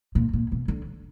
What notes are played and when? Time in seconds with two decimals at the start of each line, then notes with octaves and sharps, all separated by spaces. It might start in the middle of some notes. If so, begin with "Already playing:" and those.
0.15 A#2
0.33 A#2
0.52 B2
0.68 D3